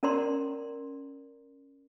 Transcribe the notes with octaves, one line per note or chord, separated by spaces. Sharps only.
C#4 A#4 D5 A#5 C6